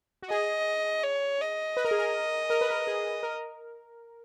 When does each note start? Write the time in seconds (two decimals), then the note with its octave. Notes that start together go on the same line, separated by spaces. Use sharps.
0.22 F#4
0.30 G#4 D#5
1.04 C#5
1.41 D#5
1.77 B4
1.85 A#4
1.91 G#4
1.98 A#4
2.50 A#4
2.61 B4
2.70 A#4
2.87 G#4
3.23 A#4